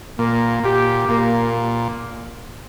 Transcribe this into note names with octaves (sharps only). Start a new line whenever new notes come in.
A#2 A#3
A#2 G4
A#2 A#3